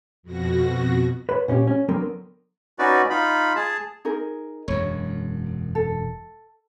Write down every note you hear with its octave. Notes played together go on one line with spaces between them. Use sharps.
F2 B2 F#4 A#6
B4 C#5 B5
A#2 C#4 F4 G4
C#4
D3 F#3 B3 A#4 G5 C6
C#4 D#4 F#4 B4 D5
D#4 F4 B5
G#4 A5
D#4 G#4 A#4
E1 F#2 C#5
A4